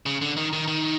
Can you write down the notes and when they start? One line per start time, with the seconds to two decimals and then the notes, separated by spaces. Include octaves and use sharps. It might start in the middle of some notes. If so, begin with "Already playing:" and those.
0.06 C#3
0.21 D3
0.37 D#3
0.53 D#3
0.68 D#3